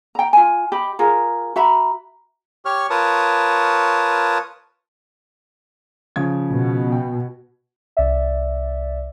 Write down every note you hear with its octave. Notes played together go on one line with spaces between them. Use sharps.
G5 A#5
F4 G#5
G4 D#5 B5
F4 G#4 A#4
F#4 E5 A#5 B5
G4 C#5 C#6 F6
F4 A#4 B4 C#5 A5 D#6
C#3 F3 G#6
B2
G5
C2 D5 E5